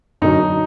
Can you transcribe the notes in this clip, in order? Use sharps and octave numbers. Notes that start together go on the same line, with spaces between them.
F#2 D3 F#3 D#4